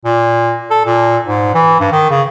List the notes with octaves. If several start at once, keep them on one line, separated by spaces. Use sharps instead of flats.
A#2
A4
A#2
G#2
E3
G2
D#3
C#3